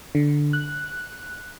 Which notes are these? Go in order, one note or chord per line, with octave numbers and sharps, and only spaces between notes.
D3
F#6